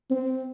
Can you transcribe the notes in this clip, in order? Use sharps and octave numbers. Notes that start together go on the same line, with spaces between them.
C4